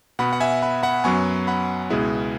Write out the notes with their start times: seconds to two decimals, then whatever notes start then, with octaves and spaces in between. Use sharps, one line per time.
0.19 B2 B3 F#5 B5
0.33 F#5
0.40 E5 G#5
0.62 F#5 B5
0.83 F#5 B5
1.04 F#2 F#3 B3 G#5 C#6
1.47 F#5 B5
1.90 C#2 B2 G#3 B3 E4 G#4